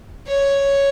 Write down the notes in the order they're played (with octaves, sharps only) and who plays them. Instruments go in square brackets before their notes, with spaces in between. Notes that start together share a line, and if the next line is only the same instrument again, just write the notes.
[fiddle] C#5